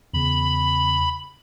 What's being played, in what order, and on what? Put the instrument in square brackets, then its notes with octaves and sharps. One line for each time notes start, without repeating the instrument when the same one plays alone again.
[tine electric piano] E2 C#3 [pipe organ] B5